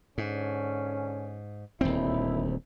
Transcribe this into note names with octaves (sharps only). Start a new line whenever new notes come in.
G#2 D3 C#4
D#1 D2 C4 D#4 E4